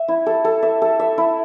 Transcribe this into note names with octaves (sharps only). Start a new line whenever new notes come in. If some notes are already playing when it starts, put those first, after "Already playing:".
Already playing: E5
E4
A4
A4
E5
A4
E5
E4